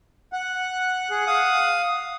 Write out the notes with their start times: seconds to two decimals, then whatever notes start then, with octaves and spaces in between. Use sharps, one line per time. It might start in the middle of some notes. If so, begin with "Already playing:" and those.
0.33 F#5
1.10 G#4
1.27 F5 D#6